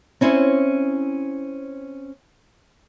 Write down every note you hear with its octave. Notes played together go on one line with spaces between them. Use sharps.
C4 C#4 E4 C5 C#5